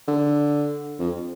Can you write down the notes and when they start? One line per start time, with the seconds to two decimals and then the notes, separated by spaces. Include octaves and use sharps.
0.08 D3
1.00 F2